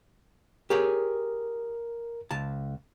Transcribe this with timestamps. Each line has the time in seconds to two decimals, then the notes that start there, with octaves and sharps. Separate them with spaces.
0.70 G4 G#4 A#4 C#5
2.31 C#2 A5